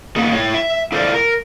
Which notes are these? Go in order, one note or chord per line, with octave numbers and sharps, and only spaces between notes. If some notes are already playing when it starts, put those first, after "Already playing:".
A#3 B3 D#4 G#4
E4 C#5
E5
E4 A4 C5 D5 F5
A#4